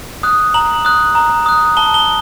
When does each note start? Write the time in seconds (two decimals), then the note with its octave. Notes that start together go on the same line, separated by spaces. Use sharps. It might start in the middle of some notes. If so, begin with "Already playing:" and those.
0.23 D#6 F#6
0.54 A#5 F#7
0.85 D#6 F#6
1.15 A#5
1.46 D#6 F#6
1.77 A5 G7
1.94 G7